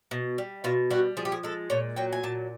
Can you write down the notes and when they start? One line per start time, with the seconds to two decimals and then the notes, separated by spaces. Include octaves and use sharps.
0.11 B2
0.38 G3
0.64 B2 F4
0.91 G3 F#4
1.17 F3 G#4
1.25 G4
1.32 G#4
1.43 G#3 A4
1.70 A#2 C#5
1.96 F#3 G5
2.13 G#5
2.23 A#2 A5